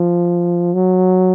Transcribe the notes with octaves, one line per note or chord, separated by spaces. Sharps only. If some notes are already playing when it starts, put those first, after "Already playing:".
Already playing: F3
F#3